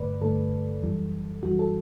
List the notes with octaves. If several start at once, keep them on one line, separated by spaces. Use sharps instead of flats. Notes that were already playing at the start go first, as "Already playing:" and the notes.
Already playing: G2 D3 A3 B4 D5
G2 D3 A3 A4
F#2 E3 G3
F#2 E3 G3 F#4
A4